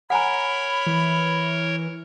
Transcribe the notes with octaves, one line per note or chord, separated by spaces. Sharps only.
A#4 C#5 F#5 G#5 A#5 B5
E3